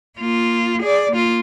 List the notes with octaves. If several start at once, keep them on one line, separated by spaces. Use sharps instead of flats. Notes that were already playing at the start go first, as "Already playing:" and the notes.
A#3 F4
G#4 D5
A#3 F4